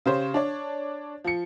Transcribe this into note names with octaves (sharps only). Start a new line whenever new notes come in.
C#3 G4 C5 C#5
D4 C#5 D5
F3 C#7